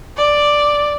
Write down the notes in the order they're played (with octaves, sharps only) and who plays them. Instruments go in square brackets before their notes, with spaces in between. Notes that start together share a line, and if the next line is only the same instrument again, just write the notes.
[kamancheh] D5